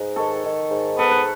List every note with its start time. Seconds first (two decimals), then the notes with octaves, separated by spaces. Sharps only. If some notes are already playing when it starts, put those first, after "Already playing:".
Already playing: G#2 B4 D#5
0.16 D#3 A4 C#5
0.44 D#3
0.71 G#2
0.99 B3 A4
1.11 B4